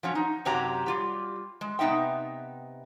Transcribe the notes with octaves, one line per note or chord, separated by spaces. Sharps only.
F3 F#3 C#4
D#4
F#2 C3 F#3 G4 A#5
G3 F4 G4
G#3
C3 B3 D#4 E5 G5